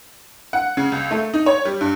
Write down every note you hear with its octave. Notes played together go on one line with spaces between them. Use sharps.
F#5
C#3
C#2
A3
D#4
C#5
G3
G2